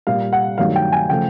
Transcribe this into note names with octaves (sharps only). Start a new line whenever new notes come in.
A#2 G3 F5
F#5
G2 D#3 F#3 A3 F5
G5
G#5
C#3 F3 A3 G5